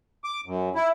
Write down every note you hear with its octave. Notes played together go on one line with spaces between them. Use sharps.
D6
F#2
E4